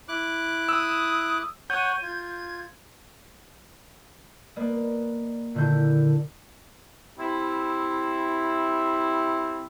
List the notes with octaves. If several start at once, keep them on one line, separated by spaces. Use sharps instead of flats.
E4 D6 F#6
D#6 E6
C#5 F#5 G6 D#7
F4 G#6
A#3 B4 D5 D#5
A#2 D3 D#3 E4 G6
G3 C4 E4